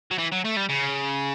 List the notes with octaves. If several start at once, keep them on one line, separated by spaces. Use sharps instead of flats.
F#3
E3
F#3
A3
G3
C#3